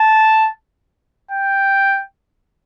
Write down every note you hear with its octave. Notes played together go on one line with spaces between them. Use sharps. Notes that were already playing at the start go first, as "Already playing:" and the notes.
Already playing: A5
G5